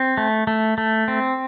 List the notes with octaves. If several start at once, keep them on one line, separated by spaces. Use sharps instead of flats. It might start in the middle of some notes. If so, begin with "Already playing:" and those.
Already playing: C4
A3
A3
A3
C4